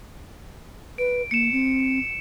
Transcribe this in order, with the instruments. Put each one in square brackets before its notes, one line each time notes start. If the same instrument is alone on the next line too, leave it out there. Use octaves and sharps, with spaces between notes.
[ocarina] B4 [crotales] D7
[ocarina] A#3 [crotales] C#7 E7
[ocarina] C4